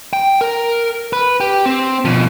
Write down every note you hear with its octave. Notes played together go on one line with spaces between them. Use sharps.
G5
A#4
B4
G4
C4
B2 F3